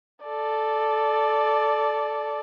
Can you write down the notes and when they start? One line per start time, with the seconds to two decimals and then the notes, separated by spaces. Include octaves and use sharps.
0.25 A4 D5